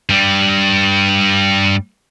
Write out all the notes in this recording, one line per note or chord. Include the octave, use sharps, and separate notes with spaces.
G2 G3